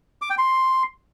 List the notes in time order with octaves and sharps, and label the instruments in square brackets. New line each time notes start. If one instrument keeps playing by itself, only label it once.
[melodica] D6
G5
C6